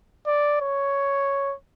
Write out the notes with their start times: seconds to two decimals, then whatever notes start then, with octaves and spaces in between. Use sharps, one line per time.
0.26 D5
0.61 C#5